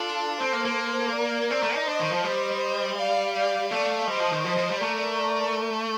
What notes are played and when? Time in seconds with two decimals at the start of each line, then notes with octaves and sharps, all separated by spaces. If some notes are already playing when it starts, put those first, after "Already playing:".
Already playing: D4 F4 A4
0.40 C4 A4 C5
0.53 A#3
0.65 A#3
1.14 A#4 D5
1.50 C4 A#4 D5
1.63 A3
1.75 D#4
1.87 D4 C5 D#5
2.00 D#3
2.12 F3
2.24 G3 C5 D#5
2.98 D5 F5
3.34 D5 F5
3.71 A3 D5 F5
4.07 G3 C5 D#5
4.20 F3
4.32 D#3
4.44 F3 C5 D#5
4.57 F3
4.69 G3
4.81 A3 A#4 D5